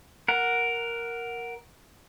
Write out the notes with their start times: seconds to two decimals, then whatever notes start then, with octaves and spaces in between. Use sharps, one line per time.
0.28 A#4 F#5